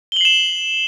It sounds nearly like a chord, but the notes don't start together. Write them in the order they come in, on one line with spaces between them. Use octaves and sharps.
G7 F#7 C7 E7